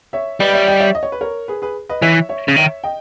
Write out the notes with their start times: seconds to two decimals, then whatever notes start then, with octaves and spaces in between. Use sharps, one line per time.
0.13 C#5 E5
0.40 G3 B4 D#5
0.53 C#5 E5
0.68 D#5 G5
0.80 C#5 E5
0.95 D#5
1.03 C#5
1.12 B4
1.21 A#4 C#5
1.48 G#4 B4
1.62 G#4 B4
1.89 B4 D#5
2.02 E3 C#5 E5
2.29 C#5 E5
2.48 C#3
2.56 D#3 C#5 E5
2.84 D#5 G5